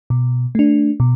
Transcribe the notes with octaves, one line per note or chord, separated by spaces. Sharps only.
B2
A3 D4
B2